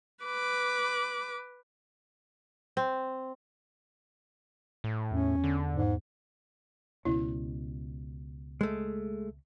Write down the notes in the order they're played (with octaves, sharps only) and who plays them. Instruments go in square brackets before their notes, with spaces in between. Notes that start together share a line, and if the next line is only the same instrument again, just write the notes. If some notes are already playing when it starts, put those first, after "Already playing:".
[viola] B4 D6
[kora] C4
[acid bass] A2
[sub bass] E2 [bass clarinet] C#4
[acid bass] D3
[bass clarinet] G#2
[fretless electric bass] C#2 B2 C#4 [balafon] E4
[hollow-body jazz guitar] G#3 A3